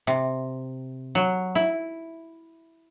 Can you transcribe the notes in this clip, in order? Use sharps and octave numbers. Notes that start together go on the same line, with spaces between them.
C3
F#3
E4